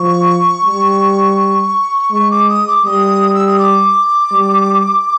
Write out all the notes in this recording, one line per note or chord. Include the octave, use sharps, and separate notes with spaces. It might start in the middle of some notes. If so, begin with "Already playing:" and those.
Already playing: F3 C#6
G3
G#3 C#6
D6
D#6
D6
G3 D#6
E6
D#6
D6
G3